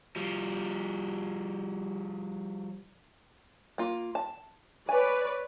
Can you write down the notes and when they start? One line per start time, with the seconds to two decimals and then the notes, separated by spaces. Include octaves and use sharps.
0.16 F3 G3
3.78 A#3 F4
4.15 A5
4.89 B4 C#5 D5 G#5